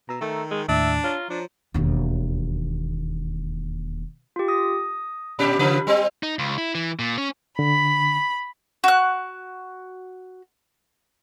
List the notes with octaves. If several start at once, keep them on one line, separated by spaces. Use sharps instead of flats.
B2 A#5 E6
D#3 A3
G#3
D#2 A2 D4 E5
F4 C#5 A#5
F3 D4
E1 D#2
F4 G4
D#6 A#6
A#2 C#4 G4 B5
C#3 F3 B4
G3 C4
D#4
C#2
E4
E3
A#2
C#4
D3 B5
F#4 F#6